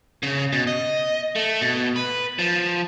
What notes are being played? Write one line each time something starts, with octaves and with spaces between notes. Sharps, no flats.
C#3
B2
D#5
A3
B2
B4
F3